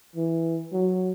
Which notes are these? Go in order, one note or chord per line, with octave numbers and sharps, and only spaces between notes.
E3
F#3